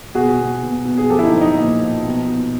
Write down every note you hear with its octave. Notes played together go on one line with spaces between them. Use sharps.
B2 F#4 G#4
B2
B2
B2
G#4
F3 G4 A4
E4
D#4
F3
D#4
A#2
F3
B2
B2